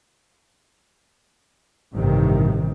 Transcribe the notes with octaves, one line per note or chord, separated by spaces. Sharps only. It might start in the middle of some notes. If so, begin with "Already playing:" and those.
A1 G2 C3 D#3